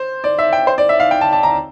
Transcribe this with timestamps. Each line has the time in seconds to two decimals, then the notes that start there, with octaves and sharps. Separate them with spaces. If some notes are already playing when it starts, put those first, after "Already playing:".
Already playing: C5
0.24 D5
0.39 E5
0.53 G5
0.67 C5
0.78 D5
0.89 E5
1.00 F5
1.11 G5
1.21 A5
1.33 A5
1.43 A#5